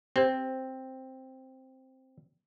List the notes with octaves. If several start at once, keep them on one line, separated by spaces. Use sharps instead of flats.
C4 G4 C5